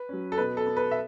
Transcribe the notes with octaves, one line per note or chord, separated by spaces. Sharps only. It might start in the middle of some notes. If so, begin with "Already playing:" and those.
Already playing: B4
F#3 C#4
A4
B2 B4
A4
B3
B4
E5